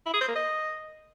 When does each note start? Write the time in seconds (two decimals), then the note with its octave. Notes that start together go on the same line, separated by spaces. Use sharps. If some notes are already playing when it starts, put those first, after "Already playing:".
0.06 E4
0.13 G#4
0.21 C5
0.28 A#3
0.35 D#5